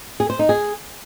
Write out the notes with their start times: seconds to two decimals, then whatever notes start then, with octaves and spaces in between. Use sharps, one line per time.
0.20 G#4
0.30 C5
0.39 D#4
0.49 G#4